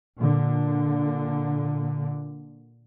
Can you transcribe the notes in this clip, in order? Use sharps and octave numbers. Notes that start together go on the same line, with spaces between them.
A#2 D3